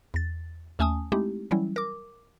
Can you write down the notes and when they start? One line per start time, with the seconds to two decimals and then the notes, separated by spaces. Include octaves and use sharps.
0.14 E2 A6
0.79 D#2 A3 C#4 G#5 A5 D#6
1.12 G#3 A3 C4 D#4 E4 G4
1.51 E3 F#3 G3 C#4 E4
1.76 A#4 D6